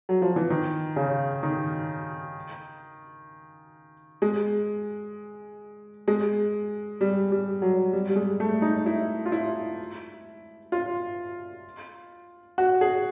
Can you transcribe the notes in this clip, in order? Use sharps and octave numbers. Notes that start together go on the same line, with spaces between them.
F#3
F3
E3
D#3
C#3
D#3
G#3
G#3
G3
G3
F#3
G3
G3
G#3
A3
D#4
E4
F4
E4
F4
F#4
G#4